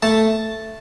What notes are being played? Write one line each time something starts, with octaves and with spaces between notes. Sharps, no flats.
A3 A5